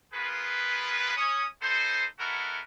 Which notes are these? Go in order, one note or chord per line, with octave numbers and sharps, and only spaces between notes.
B3 F4 G#4 A#4 B4
C#4 C#5 D#6
B3 D#4 A4 C5
G#3 B3 E4 F#4 A4 A#4